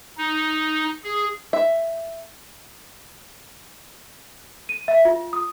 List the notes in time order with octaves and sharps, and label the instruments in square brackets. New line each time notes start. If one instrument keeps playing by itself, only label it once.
[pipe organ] D#4
G#4
[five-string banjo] E5
[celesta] D#7
E5
F4
D#6